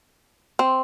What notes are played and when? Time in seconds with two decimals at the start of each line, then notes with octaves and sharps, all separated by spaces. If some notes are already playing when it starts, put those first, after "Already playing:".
0.59 C4